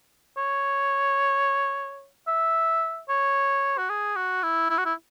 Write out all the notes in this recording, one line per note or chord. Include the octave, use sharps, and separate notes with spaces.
C#5
E5
C#5
F#4
G#4
F#4
E4
E4
F#4
E4